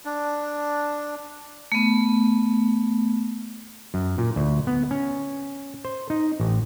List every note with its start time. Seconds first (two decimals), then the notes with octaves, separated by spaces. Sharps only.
0.05 D4
1.72 A3 B3
3.94 F#2
4.18 A#2
4.36 D2
4.67 B3
4.91 C#4
5.85 C5
6.10 D#4
6.40 A1